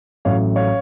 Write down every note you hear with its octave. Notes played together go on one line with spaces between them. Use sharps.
A1 A2 F#3 C#5 F5
C#5 F5